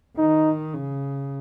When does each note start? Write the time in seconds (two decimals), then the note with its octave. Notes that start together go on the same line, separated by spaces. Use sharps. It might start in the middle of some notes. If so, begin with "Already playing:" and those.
0.17 D#3 D#4
0.73 C#3